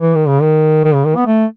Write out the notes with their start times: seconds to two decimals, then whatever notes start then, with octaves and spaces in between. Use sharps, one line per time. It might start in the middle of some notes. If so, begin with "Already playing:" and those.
0.01 E3
0.15 D#3
0.28 C#3
0.42 D#3
0.85 D#3
0.95 C#3
1.06 D#3
1.16 B3
1.27 A3